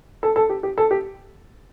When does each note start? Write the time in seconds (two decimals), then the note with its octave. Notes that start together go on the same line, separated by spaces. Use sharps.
0.23 A4
0.36 A4
0.50 G4
0.63 G4
0.78 A4
0.91 G4